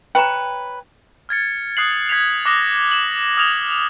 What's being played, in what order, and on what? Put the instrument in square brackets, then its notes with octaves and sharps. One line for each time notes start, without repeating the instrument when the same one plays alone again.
[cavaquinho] B4 C#5 [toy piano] G5 A#5
[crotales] F6 G#6 A6 C#7
D#6 F#6 C7 F#7
G#6 B6 C7 F7
D6 D#6 F#6 A#6 E7 G7
E7 F#7
D#6 F6 G#6 E7 F7